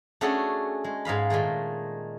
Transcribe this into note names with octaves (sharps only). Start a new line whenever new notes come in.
A3 C#4 D4 F#4 G#4 A4
G#3
G#2 D#5 F5 B5
A#2 D#3 G#3 A3